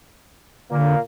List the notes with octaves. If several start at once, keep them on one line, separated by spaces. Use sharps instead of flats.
A#2 D3 A#3